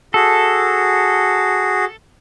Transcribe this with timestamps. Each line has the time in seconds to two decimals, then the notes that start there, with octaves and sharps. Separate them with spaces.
0.14 F#4 G#4 A4